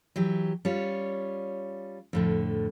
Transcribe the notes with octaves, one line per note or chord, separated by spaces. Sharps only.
E3 F#3 G4
G3 C#4 F4 C#5
F2 A2 D3